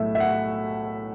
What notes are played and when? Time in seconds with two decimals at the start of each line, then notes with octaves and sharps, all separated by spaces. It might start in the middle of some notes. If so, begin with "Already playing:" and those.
Already playing: B1 A2 A3 E5
0.15 E5
0.20 F#5